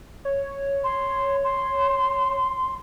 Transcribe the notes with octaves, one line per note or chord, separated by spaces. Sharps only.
C#5
C6
C6